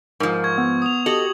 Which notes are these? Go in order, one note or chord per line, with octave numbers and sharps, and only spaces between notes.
G#2 F3 A#4
C#6 G#6
B3
D#6 F7
F#4 G4 A4 D#5 F#7